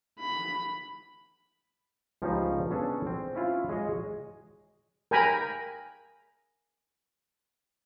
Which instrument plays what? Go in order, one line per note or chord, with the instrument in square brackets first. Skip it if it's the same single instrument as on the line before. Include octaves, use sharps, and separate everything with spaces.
[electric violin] B5
[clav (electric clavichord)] C#2 F3 G3 C#4 D#4 C5
B3 C#4 D4 G#4 A4
C4
C#4 E4 F4
G#3 G#4 C#5 D#5
[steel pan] A#4 G5 G#5 A#5 B5